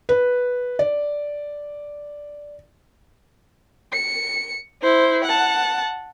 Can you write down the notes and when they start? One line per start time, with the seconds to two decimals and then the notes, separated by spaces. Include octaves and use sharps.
0.09 B4
0.79 D5
3.93 C#7
4.82 E4 C5
5.24 F#5 A5